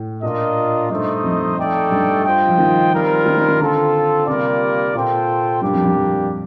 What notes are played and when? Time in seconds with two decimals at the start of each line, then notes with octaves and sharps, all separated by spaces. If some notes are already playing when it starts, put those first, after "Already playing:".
Already playing: A2
0.23 A#2 D4 F4 A#4 D#5
0.90 G2 A3 D#4 A4 C5 D#5
1.24 F2
1.58 A3 D#4 A4 D5 G5
1.91 G2
2.25 F4 C5 D#5 G5
2.47 F3
2.58 D#3
2.93 G3 C4 F4 A#4
3.26 D#3
3.38 D#3
3.48 D#3
3.60 D3 C4 F4 A4
4.27 C3 G3 A#3 F4 A#4 D5
4.94 A#2 F4 A4 C5 G5
5.62 G2 G3 A#3 D4 G4
5.73 F2
5.84 F2